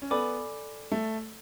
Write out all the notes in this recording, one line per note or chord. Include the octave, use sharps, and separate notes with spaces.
C#4
B3 A4 D5 G#5 B5 D6
A3